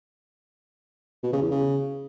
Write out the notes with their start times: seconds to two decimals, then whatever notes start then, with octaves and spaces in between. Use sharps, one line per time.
1.23 B2
1.32 C#3
1.42 E2
1.51 C#3